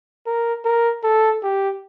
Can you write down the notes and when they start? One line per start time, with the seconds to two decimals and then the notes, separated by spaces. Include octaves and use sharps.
0.26 A#4
0.65 A#4
1.03 A4
1.43 G4